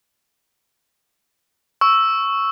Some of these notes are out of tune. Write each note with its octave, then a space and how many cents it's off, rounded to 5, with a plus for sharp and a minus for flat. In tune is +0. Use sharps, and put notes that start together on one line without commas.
C#6 +0 E6 +0